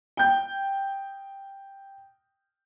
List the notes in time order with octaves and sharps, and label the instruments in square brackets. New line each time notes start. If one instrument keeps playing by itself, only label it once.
[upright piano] G5 G6